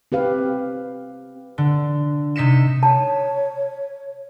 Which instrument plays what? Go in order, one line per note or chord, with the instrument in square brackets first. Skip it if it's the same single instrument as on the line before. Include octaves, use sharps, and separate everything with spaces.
[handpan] C4 G4 B4 F5
[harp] D3
C3 D#4 B6 C#7 E7
[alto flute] C#5 [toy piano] A5